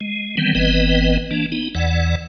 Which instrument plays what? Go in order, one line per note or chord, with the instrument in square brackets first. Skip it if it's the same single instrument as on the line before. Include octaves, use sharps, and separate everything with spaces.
[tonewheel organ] G#3
D#3 E3 G3 B3 C4
G1 E3 B3 C4 B4 D#5
E3 A#3 D4
B3 D#4
E2 E3 D5 F#5